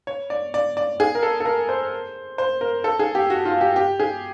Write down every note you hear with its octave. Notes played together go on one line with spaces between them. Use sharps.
C#5
D5
D5
D5
G#4
A#4
A4
A4
A#4
C5
C5
A#4
A4
G#4
G4
F#4
F4
G4
G4
G#4